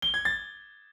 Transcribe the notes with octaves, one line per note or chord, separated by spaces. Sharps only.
G7
G#6
A6